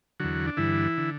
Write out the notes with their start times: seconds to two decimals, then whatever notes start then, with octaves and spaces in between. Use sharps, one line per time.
0.20 E2 D3 F#3 F#4
0.47 D4
0.57 G2 D3 E3 E4
0.98 D3